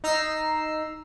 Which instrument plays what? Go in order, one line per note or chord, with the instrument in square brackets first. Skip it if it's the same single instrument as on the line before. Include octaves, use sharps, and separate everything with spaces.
[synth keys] D#4 A#5 E6 C7